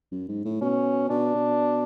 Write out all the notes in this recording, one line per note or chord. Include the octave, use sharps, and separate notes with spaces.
F#2
G#2
A2
B2 C#4
B2 D4
B2